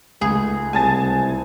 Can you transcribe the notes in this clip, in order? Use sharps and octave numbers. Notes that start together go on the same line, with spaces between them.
C#2 G#3 A3 G#4
C2 G#5 A5 A6